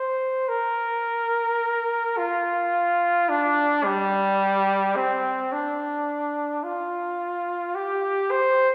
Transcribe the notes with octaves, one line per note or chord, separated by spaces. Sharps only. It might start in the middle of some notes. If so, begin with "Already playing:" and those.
Already playing: C5
A#4
F4
D4
G3
C4
D4
F4
G4
C5